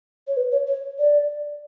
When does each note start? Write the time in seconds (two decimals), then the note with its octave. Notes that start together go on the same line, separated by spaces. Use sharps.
0.27 C#5
0.37 B4
0.52 C#5
0.67 C#5
0.99 D5